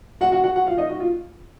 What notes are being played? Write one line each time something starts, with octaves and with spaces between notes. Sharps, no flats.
F#4 F#5
F#4 F#5
F#4 F#5
F#4 F#5
F4 F5
D#4 D#5
F#4
F4